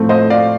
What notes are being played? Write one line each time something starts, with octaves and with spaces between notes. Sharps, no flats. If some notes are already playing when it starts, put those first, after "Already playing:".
Already playing: A2 F3 A3 C4
C5 D#5
D5 F5